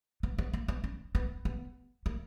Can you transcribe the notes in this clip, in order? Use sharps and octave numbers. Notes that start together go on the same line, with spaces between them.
B3
B3
A#3
B3
C#4
B3
B3
A#3